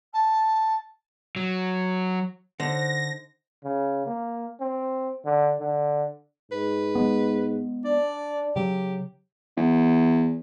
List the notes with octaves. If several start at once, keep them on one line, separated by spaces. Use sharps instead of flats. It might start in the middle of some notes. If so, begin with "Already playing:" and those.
A5
F#3
D3 D#4 A4 C5 A#6
C#3
A#3
C4
D3
D3
G#2 B4
G#3 B3
D4 D5
C#3 F#3 G4
E2